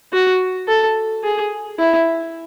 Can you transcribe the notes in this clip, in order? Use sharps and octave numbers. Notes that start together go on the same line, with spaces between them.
F#4
A4
G#4
E4